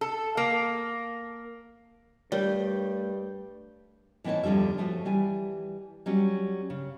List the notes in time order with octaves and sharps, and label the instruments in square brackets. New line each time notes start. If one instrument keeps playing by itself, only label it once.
[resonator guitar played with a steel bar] A4
A#3
[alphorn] G2 [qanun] G3 [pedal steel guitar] A3 G5 [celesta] A#4 C#5 D5
[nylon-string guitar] A2 E3 C4 D#4 C#5 A5
E2 D3 F3 G3 E5
F3 A3 C#4 F#4
E3 G3 G#5
F#3 G3 C#4
C#3